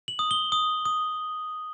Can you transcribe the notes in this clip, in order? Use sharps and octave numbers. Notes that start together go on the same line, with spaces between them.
F#7
D#6
G7
D#6
D#6